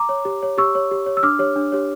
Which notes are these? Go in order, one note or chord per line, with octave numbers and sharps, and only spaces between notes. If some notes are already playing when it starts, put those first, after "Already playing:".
Already playing: A#5 D6
C#5
G4
C#5
G4 C#6 E6
C#5
G4
C#5
E6
D4 D6 F6
G4 C#5
D4
G4 C#5